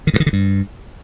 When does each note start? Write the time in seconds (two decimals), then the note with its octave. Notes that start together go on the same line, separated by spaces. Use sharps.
0.07 D#3
0.14 G2
0.20 D#3
0.26 D3
0.33 G2